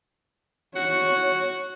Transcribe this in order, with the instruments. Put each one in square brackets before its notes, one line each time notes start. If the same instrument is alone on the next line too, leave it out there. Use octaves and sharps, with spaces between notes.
[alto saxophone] F#4 [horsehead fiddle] C#5